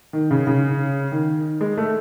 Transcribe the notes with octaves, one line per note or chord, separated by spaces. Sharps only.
D#3
C#3
C#3
D#3
G#3
A3